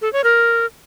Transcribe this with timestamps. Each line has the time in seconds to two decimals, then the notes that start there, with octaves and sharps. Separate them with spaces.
0.02 A4
0.13 C#5
0.24 A#4